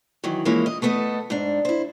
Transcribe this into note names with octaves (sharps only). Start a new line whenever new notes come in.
D#3 E3 F#3
E3 F3 G#3 A#3 C#4 E4
D#5
A3 B3 A4 D5 D#5
G#2 D4
E4 C5